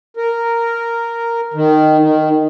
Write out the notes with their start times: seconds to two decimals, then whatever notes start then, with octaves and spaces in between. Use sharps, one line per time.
0.17 A#4
1.54 D#3
2.00 D#3